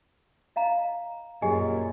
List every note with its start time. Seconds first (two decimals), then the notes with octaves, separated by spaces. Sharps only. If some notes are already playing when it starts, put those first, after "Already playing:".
0.56 D#5 F5 A#5
1.42 F#2 A#2 G4 G#4 D#5 G#5